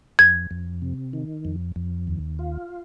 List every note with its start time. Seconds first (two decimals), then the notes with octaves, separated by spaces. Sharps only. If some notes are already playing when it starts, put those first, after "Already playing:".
0.19 F2 G#6
0.51 F2
0.82 C3
1.13 D#3
1.45 F2
1.76 F2
2.07 D#2
2.39 F4